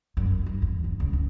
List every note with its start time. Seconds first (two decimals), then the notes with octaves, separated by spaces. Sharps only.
0.17 F#2
0.31 F#2
0.46 G2
0.62 E2
0.84 G2
1.00 C#2
1.13 C#2